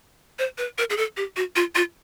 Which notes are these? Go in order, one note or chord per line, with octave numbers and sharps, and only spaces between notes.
C5
B4
A#4
G#4
A4
G4
F#4
F4
F4